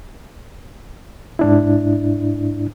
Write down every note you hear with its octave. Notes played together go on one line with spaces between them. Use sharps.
G#2 D4 E4